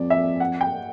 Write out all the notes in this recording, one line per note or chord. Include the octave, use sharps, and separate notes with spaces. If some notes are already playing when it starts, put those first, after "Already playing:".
Already playing: F2 D5
E5
F#5
G5